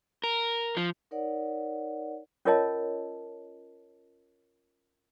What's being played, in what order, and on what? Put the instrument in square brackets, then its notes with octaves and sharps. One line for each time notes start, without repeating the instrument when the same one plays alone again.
[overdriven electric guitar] A#4
F3
[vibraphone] D#4 A#4 C#5 D5 F#5
[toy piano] C#4 F4 A#4 C#5 D#5 A5